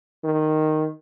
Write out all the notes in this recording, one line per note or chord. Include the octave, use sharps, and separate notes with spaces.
D#3